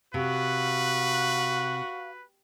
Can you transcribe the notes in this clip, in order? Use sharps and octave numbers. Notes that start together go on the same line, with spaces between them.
C3 F#4 B4 F5